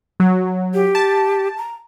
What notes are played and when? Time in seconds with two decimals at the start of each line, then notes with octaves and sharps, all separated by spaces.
0.20 F#3
0.74 G4
0.95 A5
1.58 A#5